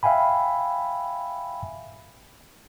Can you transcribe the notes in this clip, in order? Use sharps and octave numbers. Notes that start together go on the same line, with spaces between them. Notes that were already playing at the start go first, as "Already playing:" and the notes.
E5 F5 G5 G#5 B5